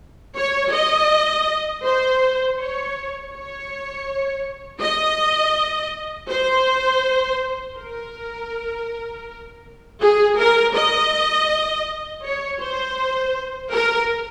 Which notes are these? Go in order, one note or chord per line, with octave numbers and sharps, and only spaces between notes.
C#5
D#5
C5
C#5
C#5
D#5
C5
A#4
G#4
A#4
D#5
C#5
C5
A#4